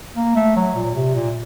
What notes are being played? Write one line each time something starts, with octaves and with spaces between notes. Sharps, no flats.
A#3
A3
F#3
A#2
C3
A#2